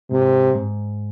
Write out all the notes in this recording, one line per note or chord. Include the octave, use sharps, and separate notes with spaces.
G#2 C3
G#2